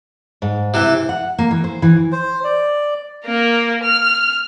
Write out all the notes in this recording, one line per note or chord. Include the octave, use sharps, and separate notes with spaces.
G#2
C3 E3
F#5
A#3
E3
C5
E3
C5
D5
A#3 A#4
F6